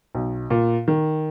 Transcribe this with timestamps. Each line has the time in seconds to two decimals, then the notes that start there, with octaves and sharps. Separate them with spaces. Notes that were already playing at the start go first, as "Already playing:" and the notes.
0.15 B1
0.50 A#2
0.88 D#3